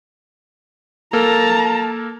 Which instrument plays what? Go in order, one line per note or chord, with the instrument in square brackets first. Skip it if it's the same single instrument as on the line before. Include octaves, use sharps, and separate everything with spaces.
[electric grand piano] A#3 A4 A#4 [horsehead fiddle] A5 A#5